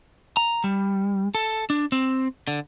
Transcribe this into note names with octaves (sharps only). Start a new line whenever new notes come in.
A#5
G3
A4
D4
C4
D3